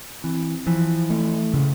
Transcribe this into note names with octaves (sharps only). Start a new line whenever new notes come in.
E3 C4
E3 F3
A3
C#3